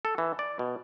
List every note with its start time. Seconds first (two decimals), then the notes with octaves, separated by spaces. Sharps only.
0.05 A4
0.18 E3
0.39 D5
0.59 B2